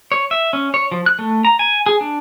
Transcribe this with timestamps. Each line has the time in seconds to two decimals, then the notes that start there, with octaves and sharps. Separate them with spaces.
0.12 C#5
0.31 E5
0.53 C#4
0.74 C#5
0.92 F3
1.06 F#6
1.19 A3
1.45 A#5
1.59 G#5
1.86 G#4
2.01 D4